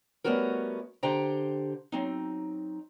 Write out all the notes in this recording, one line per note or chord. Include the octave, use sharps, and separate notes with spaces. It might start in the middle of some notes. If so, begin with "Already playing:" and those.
G3 A3 B3 C#4 F#4 A#4
D3 G4 C5 G5 A#5
F#3 C4 D#4